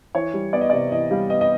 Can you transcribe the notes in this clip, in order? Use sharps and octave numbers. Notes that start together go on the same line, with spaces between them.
E3 C#5
G3
B3 D5
D#5
D5
C3
E3 D#5
G3 F5
B3 D#5
D#5